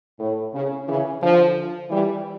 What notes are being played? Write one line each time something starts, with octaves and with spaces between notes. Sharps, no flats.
A2
C#3
C#3 E3
D3 F3
E3 G3